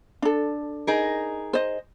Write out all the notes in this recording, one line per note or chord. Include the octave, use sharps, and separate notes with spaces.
D4 A4
D#4 G#4 A#4
C5 D#5